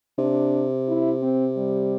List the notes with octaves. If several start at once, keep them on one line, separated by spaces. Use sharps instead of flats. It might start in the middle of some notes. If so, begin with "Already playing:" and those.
C3 D4
E4
C4
G3